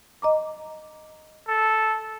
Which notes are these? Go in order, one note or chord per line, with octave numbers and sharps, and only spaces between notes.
D#5 A#5 D6
A4